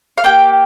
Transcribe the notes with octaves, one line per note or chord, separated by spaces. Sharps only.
F5
A#3 G4 G5